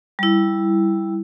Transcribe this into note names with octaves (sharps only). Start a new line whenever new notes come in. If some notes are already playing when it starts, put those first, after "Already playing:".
G3 E4